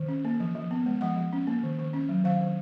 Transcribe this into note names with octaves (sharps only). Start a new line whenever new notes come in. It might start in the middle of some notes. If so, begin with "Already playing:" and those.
Already playing: D#3
C#4
A#3
F3
F3
B3
G#3
F3 F#5
F3
C#4
A#3
D#3
D#3
C#4
F#3
D#3 F5
D#3